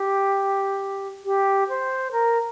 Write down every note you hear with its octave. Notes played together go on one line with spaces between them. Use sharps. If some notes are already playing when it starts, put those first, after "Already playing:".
Already playing: G4
G4
C5
A#4